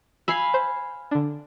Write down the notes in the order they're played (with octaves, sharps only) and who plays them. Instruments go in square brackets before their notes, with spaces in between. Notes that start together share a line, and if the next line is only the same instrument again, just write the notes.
[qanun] F5 G#5 B5 [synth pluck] E6 C7
[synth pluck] C5
D3 D4